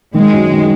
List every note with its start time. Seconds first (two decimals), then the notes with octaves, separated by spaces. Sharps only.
0.14 D#3 G#3
0.33 F#2
0.51 D#3